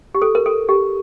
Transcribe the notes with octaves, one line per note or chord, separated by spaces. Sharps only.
G4
A4
A#4
A4
G4